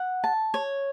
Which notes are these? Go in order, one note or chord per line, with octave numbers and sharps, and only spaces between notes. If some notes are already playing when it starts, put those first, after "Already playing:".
Already playing: F#5
A5
C#5